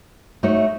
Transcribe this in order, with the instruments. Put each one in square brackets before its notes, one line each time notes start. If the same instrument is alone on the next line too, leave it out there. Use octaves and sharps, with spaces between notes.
[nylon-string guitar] A3 D#4 F#4 C#5